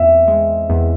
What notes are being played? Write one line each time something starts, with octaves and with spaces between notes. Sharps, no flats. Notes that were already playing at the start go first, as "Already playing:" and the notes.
Already playing: E2 C4 E5
G#3
E2